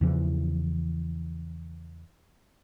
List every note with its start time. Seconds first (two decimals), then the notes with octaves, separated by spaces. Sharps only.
0.01 E2 C#3 E3 F3